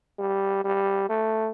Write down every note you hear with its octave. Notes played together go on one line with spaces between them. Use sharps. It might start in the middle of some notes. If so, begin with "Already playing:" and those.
G3
G3
A3